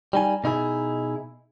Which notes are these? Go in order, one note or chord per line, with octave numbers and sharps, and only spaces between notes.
G3 D#4 G#5
B2 D#4 E4 G#4